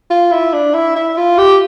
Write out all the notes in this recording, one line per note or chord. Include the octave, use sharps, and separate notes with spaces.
F4
E4
D4
E4
E4
F4
G4